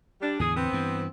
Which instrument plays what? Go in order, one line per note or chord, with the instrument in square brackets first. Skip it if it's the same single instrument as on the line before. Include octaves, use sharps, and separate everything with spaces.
[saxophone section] G3 D4
[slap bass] E2 A2 D3 [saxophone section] G#4
[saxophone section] B3 C4
[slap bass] G2 E3